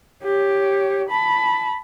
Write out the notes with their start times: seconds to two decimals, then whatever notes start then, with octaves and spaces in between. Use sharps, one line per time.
0.23 G4 C#5
1.09 A5 B5